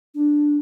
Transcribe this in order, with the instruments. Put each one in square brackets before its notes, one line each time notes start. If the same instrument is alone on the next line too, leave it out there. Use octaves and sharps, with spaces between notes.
[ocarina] D4